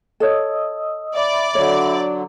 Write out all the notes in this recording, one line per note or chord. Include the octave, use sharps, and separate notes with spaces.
A4 C#5 D#5 D#6 E6
D5 E5 B5
D3 F#3 C#5 D#5